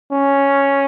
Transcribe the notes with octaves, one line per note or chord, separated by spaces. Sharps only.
C#4